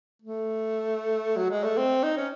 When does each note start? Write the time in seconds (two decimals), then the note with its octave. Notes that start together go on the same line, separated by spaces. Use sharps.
0.22 A3
1.37 F#3
1.50 G#3
1.64 A3
1.77 C4
2.03 D#4
2.17 C#4